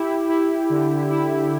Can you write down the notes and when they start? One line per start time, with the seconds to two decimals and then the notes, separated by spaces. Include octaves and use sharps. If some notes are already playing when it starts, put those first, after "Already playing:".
Already playing: E4 G4
0.29 E4
0.70 D3
1.10 E4